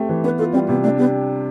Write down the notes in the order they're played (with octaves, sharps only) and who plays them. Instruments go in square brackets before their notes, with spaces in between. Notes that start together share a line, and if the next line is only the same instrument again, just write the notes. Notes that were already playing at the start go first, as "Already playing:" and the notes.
Already playing: [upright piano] A3 C4 G4
E3
[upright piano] B3 [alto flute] B4
[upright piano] F4 [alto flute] A4
[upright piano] G3 [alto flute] C4
[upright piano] C3 [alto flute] B3
[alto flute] A3 [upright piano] D4
[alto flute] B3 [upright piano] G4